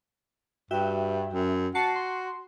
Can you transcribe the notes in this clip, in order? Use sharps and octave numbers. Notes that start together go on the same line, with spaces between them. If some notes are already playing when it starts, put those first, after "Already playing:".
G2 F#4 E5 G5
F#2
F#4 A5 C7 C#7
C6